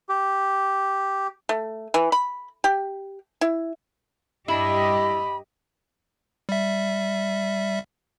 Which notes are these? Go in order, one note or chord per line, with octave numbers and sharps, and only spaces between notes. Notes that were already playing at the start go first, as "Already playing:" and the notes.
G4
A3
E3
B5
G4
E4
G2 D4 E4 G4 D#5 B5
G3 E5